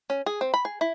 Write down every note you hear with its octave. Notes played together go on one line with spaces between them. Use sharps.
C#4
G#4
C4
B5
G#4
E4